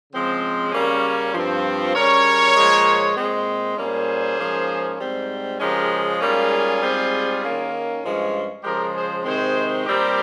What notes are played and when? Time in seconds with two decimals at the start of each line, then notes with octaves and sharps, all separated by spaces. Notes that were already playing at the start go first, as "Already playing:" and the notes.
0.11 C#3 F3 G#3 C4
0.72 C#3 G3 A#3 C#4
1.34 G2 F3 C4
1.94 C#3 G3 C#4 A#4 C#5
2.55 A#2 F3 G#3
3.17 A#2 G#3 C4
3.76 A#2 G3 A#3 C#4 G#4 C5
4.38 G#2 F3 A#3 C#4
4.99 G#2 G3 C4
5.60 C#3 F3 G#3 C#4 G4 A#4
6.20 G#2 G3 A#3 C#4 F4 G#4
6.82 G#2 G3 C4
7.43 D#3 A#3 C#4
8.03 G2 F3 G#3 C#4
8.64 C#3 F3 G#3 G4 A#4
8.94 G#4 C5
9.25 C3 D#3 G#3 C4 G#4 C5
9.85 A#2 G3 C4 G4 A#4